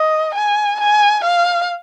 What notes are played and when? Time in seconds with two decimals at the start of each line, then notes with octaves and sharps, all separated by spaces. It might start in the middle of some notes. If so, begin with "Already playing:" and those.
Already playing: D#5
0.35 G#5
0.80 G#5
1.25 F5